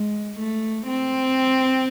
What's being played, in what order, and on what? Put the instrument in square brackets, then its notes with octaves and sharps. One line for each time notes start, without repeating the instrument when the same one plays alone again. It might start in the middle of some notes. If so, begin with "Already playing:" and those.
Already playing: [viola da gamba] G#3
A3
C4